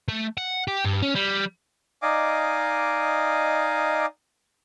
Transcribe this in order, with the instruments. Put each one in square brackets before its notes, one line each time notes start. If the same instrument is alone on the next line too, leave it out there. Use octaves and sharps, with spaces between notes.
[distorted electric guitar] A3
F#5
G4
G2
C#4
G3
[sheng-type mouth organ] D#4 D5 D#5 F5 G#5 D6